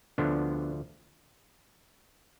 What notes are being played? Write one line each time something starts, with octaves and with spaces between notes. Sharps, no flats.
D2 D3 F3 B3 D4